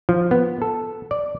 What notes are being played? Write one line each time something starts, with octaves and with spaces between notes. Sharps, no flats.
F3
B3
A4
D5